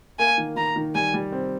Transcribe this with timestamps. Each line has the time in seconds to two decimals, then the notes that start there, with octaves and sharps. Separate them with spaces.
0.19 A#3 G#5
0.38 D#3
0.56 D#3 A#5
0.76 D#3
0.95 G3 G#5
1.14 G3
1.32 C4